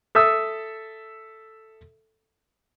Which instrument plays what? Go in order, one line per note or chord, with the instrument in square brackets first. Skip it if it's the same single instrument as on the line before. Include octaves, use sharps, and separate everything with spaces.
[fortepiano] A4 E5 D#6 E6